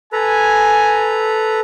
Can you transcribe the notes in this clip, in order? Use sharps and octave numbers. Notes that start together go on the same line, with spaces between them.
A4 B4 G#5 A#5